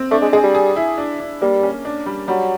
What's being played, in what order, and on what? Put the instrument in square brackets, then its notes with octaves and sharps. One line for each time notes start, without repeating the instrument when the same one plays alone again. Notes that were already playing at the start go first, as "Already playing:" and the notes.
Already playing: [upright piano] C4
[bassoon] A3 [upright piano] D4
[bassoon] G#3
[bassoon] G#3 [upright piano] G#4
[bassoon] G3
[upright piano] G#4
E4
D4
D4
[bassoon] G3 [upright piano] A#3
[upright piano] C#4
D4
G3
[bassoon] F#3 [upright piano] G3